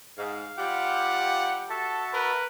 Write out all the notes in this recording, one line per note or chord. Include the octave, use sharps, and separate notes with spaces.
G#2 F5
G3 F4 G4 F#5
F#4 A4 E5 A5
A#4 B4